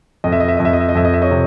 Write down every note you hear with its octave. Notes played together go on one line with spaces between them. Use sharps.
F2 D#5
E5
D#5
E5
F2 D#5
E5
D#5
E5
D#5
F2 E5
D#5
E5
C#5 D#5
C3